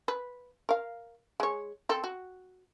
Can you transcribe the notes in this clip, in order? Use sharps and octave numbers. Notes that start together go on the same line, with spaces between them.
B4
A#4 F5
G#3 C#5
C4 A4
F#4